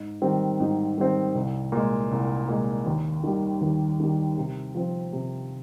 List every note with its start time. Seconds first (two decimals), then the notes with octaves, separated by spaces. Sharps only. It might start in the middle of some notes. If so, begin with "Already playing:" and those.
Already playing: G#2
0.22 D#3 G3 C4
0.60 G#2
0.98 D#3 G3 C4
1.35 C2
1.72 A#2 G#3
2.11 C2
2.49 A#2 G#3
2.86 D#2
3.23 D#3 G3
3.61 D#2
4.00 D#3 G3
4.37 C3
4.75 F3 C4
5.12 C3